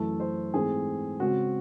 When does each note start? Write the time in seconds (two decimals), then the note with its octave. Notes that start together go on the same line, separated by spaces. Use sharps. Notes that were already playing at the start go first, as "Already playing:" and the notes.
Already playing: F#2 E3 A3 A4
0.20 C5
0.53 G#2 E3 A3 C4 G#4
1.20 C#3 G#3 C4 F#4